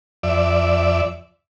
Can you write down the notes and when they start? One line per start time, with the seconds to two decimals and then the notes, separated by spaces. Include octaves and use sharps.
0.23 F2 D5 E5